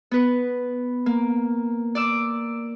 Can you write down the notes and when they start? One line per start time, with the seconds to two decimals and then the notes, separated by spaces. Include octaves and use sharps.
0.11 B3 B4
1.06 A#3
1.95 D5 D6 E6